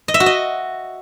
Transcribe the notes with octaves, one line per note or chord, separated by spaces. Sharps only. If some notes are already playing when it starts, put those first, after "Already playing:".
D#5
E5
F#4
D#5